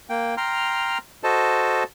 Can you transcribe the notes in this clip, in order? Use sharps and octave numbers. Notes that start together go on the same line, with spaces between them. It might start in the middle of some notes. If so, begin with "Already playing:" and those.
A#3 G5
G5 A#5 C6 F6
F#4 A4 C5 D#5 A5